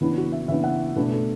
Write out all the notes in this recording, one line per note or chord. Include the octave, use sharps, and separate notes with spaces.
C#3 E3 B3 D4 E4
F#4
E5
C#3 E3 B3 D4 E5
F#5
B2 A3 D4 B4
A4